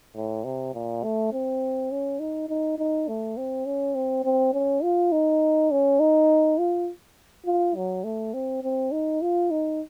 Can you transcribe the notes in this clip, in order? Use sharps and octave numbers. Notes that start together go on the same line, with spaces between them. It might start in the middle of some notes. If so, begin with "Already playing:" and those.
A2
C3
A#2
A3
C4
C#4
D#4
D#4
D#4
A3
C4
C#4
C4
C4
C#4
F4
D#4
C#4
D#4
F4
F4
F#3
A3
C4
C4
D#4
F4
D#4